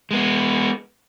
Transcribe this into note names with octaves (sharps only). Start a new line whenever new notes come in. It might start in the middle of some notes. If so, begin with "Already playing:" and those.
G#3 B3